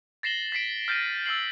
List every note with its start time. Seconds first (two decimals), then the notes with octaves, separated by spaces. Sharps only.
0.23 A6 A#6 C7 E7 F#7 G7
0.52 A6 B6 C7 D7
0.88 F6 G6 A6 A#6 D#7
1.26 E6 F6 A6 C7 F#7